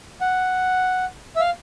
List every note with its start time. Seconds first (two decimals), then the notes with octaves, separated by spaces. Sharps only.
0.21 F#5
1.36 E5
1.40 F5